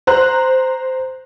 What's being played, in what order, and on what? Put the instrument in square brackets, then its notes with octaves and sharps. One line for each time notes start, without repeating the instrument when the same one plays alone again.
[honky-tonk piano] C5 A#5 F#6